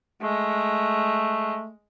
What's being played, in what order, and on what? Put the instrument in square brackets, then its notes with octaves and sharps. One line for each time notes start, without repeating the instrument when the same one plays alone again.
[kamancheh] G#3 [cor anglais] A3